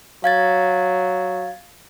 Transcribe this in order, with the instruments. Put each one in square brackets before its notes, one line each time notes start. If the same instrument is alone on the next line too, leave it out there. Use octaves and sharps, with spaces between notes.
[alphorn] F#3 [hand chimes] F5 G#6 A6